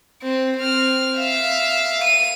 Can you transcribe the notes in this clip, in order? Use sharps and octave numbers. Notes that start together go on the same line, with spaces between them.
C4
C4 F6
E5 F5
D#7